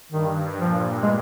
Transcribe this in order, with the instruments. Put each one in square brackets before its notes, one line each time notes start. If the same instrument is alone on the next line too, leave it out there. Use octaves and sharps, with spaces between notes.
[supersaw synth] G2 [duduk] D#3
[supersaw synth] A#2 [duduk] F3
[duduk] G#3